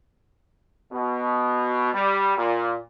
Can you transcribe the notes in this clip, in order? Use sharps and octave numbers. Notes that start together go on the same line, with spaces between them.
B2
G3
A#2